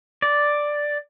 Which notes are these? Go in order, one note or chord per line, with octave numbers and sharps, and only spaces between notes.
D5